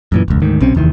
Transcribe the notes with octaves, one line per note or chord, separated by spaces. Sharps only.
F#2 A#2 E3
E1 C#2
D2 G#2 D#3
B1 C3 C4 C#4
F1 D#2 D#3 E3